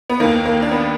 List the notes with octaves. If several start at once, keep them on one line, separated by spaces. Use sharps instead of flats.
B3
D#2 D#3 A#3
A#3
D4
B3